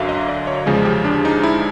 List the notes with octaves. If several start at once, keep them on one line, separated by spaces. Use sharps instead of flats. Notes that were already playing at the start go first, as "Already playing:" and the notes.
Already playing: F#2 D3 F#3 E5 F5
D#5
D5
C#5
E2 C#3 F3 G#3 G#4
G4
D4
D#4
E4